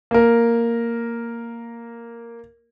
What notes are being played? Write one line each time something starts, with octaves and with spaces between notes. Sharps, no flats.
A#3 A#4